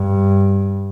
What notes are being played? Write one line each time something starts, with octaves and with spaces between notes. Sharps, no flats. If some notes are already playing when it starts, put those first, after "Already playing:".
Already playing: G2